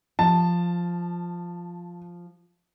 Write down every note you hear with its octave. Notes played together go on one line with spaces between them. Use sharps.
F3 A5